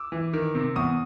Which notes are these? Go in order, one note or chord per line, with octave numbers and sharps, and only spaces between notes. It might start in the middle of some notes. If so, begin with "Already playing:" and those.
Already playing: D6 E6
E3
D#3
C3
E2 C#6 D#6